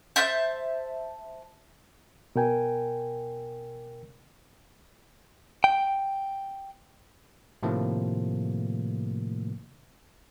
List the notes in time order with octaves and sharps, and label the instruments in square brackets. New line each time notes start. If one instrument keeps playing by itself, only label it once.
[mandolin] C5 E5 A5 G6
[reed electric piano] B2 A#4 G5 G#5
[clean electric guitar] G5
[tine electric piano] A2 C3 D#3 F3 A3 A#3